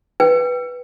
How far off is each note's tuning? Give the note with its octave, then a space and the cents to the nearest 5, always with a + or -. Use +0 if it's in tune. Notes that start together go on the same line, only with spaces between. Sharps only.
B4 +0 G5 +0